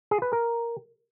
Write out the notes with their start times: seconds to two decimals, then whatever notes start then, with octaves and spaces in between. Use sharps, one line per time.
0.11 G#4
0.22 B4
0.33 A#4